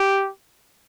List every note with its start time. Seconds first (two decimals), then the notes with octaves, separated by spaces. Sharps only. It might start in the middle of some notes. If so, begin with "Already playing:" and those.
Already playing: G4